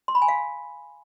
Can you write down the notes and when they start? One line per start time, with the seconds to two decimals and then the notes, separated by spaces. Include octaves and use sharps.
0.08 C6
0.15 B5
0.22 G#5
0.28 F5